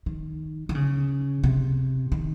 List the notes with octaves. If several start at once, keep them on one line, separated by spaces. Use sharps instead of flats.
D#3
D#3
C#3
C3
D#3